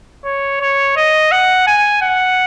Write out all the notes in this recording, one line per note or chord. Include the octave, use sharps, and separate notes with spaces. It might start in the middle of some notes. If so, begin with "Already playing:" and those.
C#5
C#5
D#5
F#5
G#5
F#5